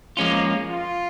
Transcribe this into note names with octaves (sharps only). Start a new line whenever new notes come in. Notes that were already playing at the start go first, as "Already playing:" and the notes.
F2 F3 G#3 A#3 C#4 F4
F4